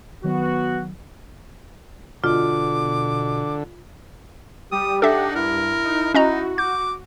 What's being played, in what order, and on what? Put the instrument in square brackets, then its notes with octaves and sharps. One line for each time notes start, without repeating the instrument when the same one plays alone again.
[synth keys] D#3 F#3 [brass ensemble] B3 F#4
[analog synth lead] B2 [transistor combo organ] D3 [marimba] F4 [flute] D6
[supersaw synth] G3 [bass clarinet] G4 [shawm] D#6
[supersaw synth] D4 F#5 [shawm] D#4 [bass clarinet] G4 [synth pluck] A4 E5
[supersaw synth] G2 [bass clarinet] E4 [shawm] A#4
[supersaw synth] D#4
[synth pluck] C#4 D#5 A#5 [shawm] D#4 [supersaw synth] F#4
[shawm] D6 [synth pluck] G6